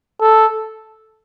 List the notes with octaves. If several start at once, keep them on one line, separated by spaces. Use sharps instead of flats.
A4